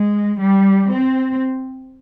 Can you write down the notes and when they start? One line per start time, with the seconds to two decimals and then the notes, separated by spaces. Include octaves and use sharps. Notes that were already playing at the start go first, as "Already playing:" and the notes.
Already playing: G#3
0.39 G3
0.90 C4